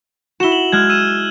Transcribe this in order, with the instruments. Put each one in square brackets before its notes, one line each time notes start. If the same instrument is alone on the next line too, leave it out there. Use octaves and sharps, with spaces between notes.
[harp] E4 F#4 [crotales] E7 G7
[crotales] F#7
[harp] G#3 [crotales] F6 F#6 G#6
[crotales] E6 D#7 E7